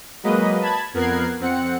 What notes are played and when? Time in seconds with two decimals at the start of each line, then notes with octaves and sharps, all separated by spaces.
0.23 F#3 G#3 A#3 B4 D#5
0.62 A5 B5 G#6
0.94 F2 B3 A#4 F#6 G#6 C7
1.40 F2 C4 F#5 C#7